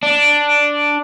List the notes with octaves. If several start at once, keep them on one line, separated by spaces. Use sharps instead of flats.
D4